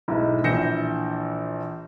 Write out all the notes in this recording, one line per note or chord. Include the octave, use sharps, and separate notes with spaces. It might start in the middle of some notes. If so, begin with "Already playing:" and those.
B1 G#2 E4
A#1 E3 G6 A#6 C#7 E7